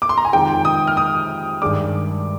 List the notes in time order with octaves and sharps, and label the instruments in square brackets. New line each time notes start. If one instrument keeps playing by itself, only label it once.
[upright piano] D6
C6
A#5
G#5
[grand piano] F2 D#3 G#3 D#4 [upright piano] G5
[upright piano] D#6
F6
D#6
[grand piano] G2 D#3 G#3 D4 [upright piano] D6